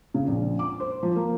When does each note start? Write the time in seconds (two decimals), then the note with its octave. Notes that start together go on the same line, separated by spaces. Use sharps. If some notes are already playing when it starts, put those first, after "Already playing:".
0.14 C#3
0.28 A#1
0.59 D6
0.80 C5
1.03 F3
1.16 A#3